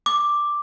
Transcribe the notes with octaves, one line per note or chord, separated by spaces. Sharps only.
D6